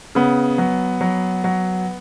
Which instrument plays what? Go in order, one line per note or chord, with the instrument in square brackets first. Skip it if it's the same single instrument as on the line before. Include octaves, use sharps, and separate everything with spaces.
[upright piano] C#3 B3
F#3
F#3
F#3